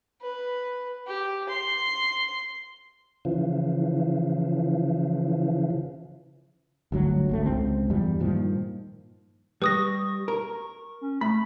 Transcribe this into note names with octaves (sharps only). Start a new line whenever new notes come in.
B4
G4
C6
C#3 E3 F3
G1 D2 F#3
G#1 D2 A3
C#2 C4
E2 G2 G3
G2 A#2 D#3 F3
G3 B4 C#6 D#6 A#6
A#4 C#6
C#4
A3 B5